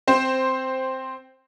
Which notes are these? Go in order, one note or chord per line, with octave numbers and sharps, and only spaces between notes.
C4 C5